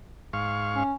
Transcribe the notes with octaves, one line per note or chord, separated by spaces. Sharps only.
G#2 F5 C#6
C#4